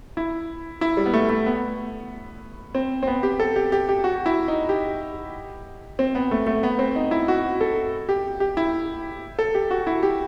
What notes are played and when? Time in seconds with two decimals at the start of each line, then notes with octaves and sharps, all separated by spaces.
0.17 E4
0.81 E4
0.97 G3
1.06 B3
1.13 A3
1.29 A3
1.46 B3
2.75 C4
3.03 C4
3.07 B3
3.23 G4
3.40 A4
3.56 G4
3.72 G4
3.89 G4
4.04 F#4
4.26 E4
4.48 D#4
4.69 G4
5.99 C4
6.15 B3
6.31 A3
6.47 A3
6.63 B3
6.79 C4
6.96 D#4
7.11 E4
7.28 F#4
7.61 A4
8.09 G4
8.40 G4
8.57 E4
9.39 A4
9.55 G4
9.71 F#4
9.87 E4
10.03 G4